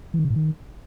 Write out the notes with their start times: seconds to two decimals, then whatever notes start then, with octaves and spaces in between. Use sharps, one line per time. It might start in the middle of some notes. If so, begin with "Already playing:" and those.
0.14 E3
0.19 D#3
0.25 C#3
0.30 A2
0.36 D#3